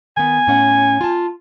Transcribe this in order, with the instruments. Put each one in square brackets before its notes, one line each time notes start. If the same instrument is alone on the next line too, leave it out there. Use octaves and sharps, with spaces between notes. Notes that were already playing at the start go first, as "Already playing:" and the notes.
[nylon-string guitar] D#3 B3 [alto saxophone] G#5
[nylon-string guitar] A2 C#4 F#5
F4 A5